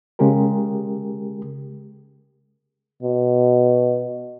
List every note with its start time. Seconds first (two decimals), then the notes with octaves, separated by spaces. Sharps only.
0.19 C#3 G#3 G4 G#4 A#4
3.03 B2